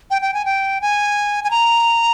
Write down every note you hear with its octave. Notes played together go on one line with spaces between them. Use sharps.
G5
G5
G#5
G5
G#5
G#5
A#5